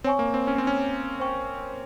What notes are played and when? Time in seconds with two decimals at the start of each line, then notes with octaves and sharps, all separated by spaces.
0.04 C4 C#5 G#5 C#6
0.19 A#3
0.34 C4
0.47 C#4
0.58 C4
0.67 C#4
1.20 C5 G5 C#6